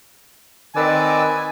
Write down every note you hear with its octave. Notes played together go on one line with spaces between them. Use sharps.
D#3 C4 B4 D5 G#5 D6 E6